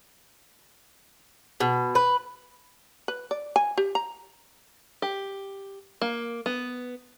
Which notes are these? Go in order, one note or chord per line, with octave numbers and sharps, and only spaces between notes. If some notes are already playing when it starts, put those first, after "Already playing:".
B2
B4
B4
D5
G#5
G4
A#5
G4
A#3
B3